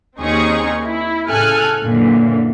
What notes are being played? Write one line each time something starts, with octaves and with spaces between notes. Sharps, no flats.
D#2 C4 C#4 D#4 G#4 C#6
E4
A2 C#3 A4 G#5 F6 F#6
F#2 A#2 D3 E3